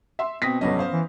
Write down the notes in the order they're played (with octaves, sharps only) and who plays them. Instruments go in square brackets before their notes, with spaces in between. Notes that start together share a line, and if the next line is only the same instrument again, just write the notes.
[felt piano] E5 C6
[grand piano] B2 [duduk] C4 [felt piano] D#6 A#6 B6
[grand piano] F1 G2 D#5 [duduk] F#3 [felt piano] B3 C#4
[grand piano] C5 F5
[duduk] E3